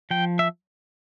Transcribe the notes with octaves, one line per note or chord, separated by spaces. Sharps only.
F3 G5
E5